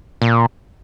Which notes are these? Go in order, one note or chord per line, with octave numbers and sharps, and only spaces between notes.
A#2